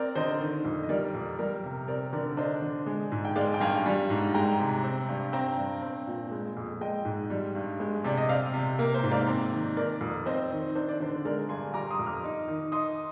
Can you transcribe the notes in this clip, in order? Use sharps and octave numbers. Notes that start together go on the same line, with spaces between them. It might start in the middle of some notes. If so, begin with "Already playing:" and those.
Already playing: C4 A#4 D5
D3 C5 D#5
D#3
F2
D#5
G3 A#4 D5
F2
G3 A#4
C3
C4 A#4 D5
D3 A#4 D5
D4 C5 D#5
D3
G#3
G#2
G5
G#3 D5 F5
G5
G2 F5 G#5
G3
G#2
G#3 G5 A#5
C3
C4
G2
C4 G5 A#5
G2
C4
A#2
G#3
F2
G#3 D#5 G5
G#2
G3
G2
G#3
C3 D5
D#5
C4 D5 F5
C3
A#3 A#4
C5
G#2
D5 F5
C4
D#3
D#3 A#4 D5
F2
C4 C5 D#5
D#3
D4 C5
D5
D3 C5
G#3 A#4 D5
G2 G#5 C6
G3 A#5 D6
C6 D#6
F2
D6 F6
D#4
D#3
D#4 C6 D#6